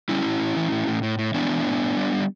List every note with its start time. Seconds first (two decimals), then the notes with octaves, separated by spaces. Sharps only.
0.09 G3 C#4 E4
0.25 A2
0.40 A2
0.56 E3
0.71 A2
0.87 A2
1.03 A2
1.19 A2
1.34 E3 B3 D4
1.50 E3
1.66 A2
1.82 A2
1.97 G3
2.12 G3